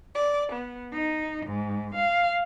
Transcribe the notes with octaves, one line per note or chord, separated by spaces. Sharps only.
D5
B3
D#4
G#2
F5